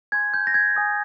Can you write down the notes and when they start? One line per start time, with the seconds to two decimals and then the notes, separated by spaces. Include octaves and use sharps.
0.12 G#5 C6 G6 G#6
0.34 G6
0.47 A#6
0.54 G#6
0.76 G#5 D#6 G6